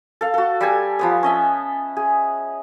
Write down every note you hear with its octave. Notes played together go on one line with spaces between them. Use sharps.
A4 F5
F#4 A4
G3 A4 G#5
F3 B3 D#6
C#4 D#5 E5
G#4